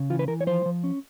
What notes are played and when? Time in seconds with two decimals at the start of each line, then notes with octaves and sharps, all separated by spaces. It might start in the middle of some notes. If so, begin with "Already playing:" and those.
Already playing: C#3
0.10 E3 F4
0.19 B4
0.28 E3 A#4
0.41 C#5
0.47 F3 C5
0.66 F3
0.84 C#4